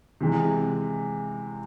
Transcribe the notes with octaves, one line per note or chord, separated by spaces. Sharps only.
C3 E3 G#3